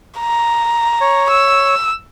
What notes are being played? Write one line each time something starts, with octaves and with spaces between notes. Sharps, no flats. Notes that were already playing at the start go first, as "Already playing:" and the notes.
A#5
C#5
E6